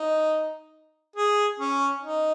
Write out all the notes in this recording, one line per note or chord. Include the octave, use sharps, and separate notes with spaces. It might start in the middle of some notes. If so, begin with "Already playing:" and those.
Already playing: D#4
G#4
C#4
D#4